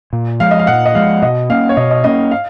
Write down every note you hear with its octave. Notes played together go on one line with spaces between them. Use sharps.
A#2
F3 G#3 F5
D#5
F5
A#2 F#5
D#5
F3 G#3 F5
B2 D#5
A#3 C#4 F5
C#5
B2 D#5
D#5
A#3 C#4 D#5
F5